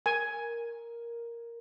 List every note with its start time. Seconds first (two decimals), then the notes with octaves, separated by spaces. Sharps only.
0.06 A#4 G#5